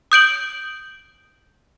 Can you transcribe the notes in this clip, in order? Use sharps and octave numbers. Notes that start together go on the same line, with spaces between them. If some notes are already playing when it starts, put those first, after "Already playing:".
D#6 G6 D7 F#7